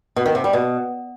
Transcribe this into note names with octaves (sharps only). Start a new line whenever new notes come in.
B2
D#3
C3
G3
B2